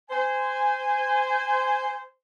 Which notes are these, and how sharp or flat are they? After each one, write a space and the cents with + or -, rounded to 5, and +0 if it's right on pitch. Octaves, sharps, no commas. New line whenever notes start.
C5 -20 G#5 -15